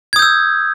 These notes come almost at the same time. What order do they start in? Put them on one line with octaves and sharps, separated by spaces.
G#6 D#6 G6 E6